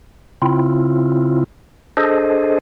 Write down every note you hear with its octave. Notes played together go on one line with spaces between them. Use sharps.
C#3 C4 E4 F4
D4 G#4 A4 C5 D#5